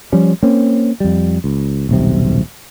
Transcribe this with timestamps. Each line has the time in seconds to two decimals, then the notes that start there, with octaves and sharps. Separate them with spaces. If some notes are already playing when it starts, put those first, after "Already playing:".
0.12 F3 G3 C#4
0.43 A#3 C4 C#4
1.00 F2 G3
1.44 C#2
1.89 D#1 B1 C3